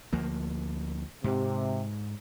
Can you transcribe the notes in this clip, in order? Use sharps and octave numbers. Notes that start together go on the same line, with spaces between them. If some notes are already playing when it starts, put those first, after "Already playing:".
D2 F3 A#3
G#2 C3